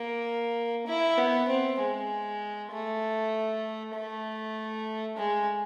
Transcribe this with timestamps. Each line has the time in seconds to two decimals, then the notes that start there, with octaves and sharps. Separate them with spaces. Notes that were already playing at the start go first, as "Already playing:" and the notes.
Already playing: A#3
0.87 E4
1.17 B3
1.48 C4
1.79 G#3
2.72 A3
3.94 A3
5.17 G#3